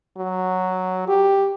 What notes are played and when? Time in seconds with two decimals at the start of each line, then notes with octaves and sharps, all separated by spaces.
0.18 F#3
1.08 G4